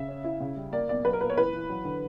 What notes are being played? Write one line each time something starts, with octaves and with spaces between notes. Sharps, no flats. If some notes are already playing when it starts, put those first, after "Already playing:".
Already playing: C#3 E5
C#4
E4
C#3
G3
A#3 D5
B1 D5
F#3 B4
A#4
A#2 B4
C#5
E3 B4
E3
F#3
D3